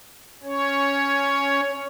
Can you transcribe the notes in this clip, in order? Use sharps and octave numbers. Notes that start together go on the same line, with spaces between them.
C#4 C#5